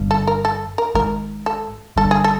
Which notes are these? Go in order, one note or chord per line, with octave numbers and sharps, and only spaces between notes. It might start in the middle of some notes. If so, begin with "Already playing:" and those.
Already playing: G1 G2
A4
A#4
A4
A#4
G#1 G#2 A#4
A4
G1 G2 A4
G#4
A4